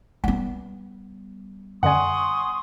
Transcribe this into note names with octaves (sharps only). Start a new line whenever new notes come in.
G3 B3 F#5
F#2 D3 D5 F#5 G#5 C6 C#6 D#6